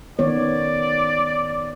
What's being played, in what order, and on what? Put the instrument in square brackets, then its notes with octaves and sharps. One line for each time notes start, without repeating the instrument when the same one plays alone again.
[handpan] D#3 B3 C#5 [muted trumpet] D5